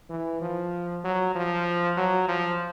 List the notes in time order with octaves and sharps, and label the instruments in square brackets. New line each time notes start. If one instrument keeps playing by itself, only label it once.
[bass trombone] E3
F3
F#3
F3
F#3
F3